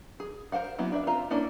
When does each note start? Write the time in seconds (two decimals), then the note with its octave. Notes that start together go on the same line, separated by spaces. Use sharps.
0.20 G#4
0.52 A#4 C5 F5 F#5
0.79 F#3 A#3 B3 C#4 E4
0.92 D4 B4 E5
1.07 C4 F4 E5 F5 A#5
1.30 A#3 C#4 D4 E4